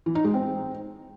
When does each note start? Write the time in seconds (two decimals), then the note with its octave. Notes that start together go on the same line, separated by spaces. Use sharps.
0.06 E3
0.15 D#4
0.24 G#3
0.34 C4